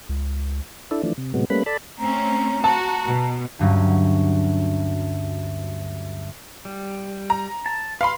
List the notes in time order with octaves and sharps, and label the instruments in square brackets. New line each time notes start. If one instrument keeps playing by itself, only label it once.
[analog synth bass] C#2
[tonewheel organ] D4 E4 A4
E3 F3 A3 D4
C3
A2 C3 F#3 G#3 B3
G3 A3 A#3 C#4 B4 B5
A4 D5 A5 B5
[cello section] A3 C4 C#4 [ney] A#5
[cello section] F#4 [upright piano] A5
[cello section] B2
[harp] D2 G2 F#3 C#4
[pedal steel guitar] G3
[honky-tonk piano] A#5
[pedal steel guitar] A5
[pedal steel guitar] B4 C6 [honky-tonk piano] F5 B5